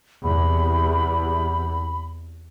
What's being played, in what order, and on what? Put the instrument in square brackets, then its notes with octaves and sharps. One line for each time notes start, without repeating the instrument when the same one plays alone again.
[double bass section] E2 C3 [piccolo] B5